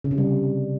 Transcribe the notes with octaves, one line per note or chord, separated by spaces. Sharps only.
C#3
C3
G3